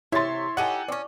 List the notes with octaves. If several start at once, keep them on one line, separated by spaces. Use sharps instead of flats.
C3 E4 C#5 E5 C6 A6
D#4 G4 A4 F#5 G#5
C4 C#4 D5 C#6